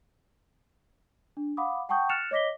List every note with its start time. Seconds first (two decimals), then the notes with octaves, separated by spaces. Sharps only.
1.37 D4
1.57 F5 F#5 B5 D6 D#6
1.89 F#5 G5 A5 C#6 D#6 G6
2.09 F6 F#6 A6 C#7 E7 F7
2.31 C#5 D#5 D6 A#6 B6 G7